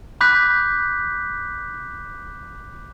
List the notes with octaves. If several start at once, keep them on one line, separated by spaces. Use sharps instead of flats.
B5 D6 F#6 G6 B6